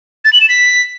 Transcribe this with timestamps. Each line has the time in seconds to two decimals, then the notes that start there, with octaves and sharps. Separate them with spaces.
0.25 A6
0.33 F#7
0.41 E7
0.49 B6